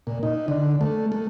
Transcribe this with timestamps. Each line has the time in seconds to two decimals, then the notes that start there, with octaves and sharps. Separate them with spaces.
0.07 A#2
0.23 D#4
0.48 D3
0.81 A3
1.12 A3